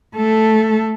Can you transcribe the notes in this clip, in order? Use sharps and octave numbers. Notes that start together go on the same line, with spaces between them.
A3 A4